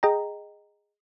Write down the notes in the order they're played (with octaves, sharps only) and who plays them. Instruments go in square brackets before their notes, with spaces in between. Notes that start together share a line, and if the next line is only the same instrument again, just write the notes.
[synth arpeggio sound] G#4 D#5 G5 A#5